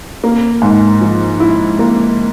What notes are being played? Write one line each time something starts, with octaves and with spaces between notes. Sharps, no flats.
A#3
G#2
F3
E4
A#3